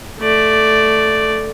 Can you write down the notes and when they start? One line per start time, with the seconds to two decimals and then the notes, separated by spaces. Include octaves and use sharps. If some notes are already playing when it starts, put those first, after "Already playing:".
0.20 A3 D5